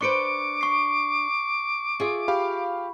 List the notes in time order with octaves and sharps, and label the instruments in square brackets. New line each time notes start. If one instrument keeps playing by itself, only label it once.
[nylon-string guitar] D4 B4 C5 [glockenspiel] C#6 C#7 D7 [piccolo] D6
[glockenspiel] C#6 C7
[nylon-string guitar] F4 G#4 E5
[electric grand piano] G4 F5 [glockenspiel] B5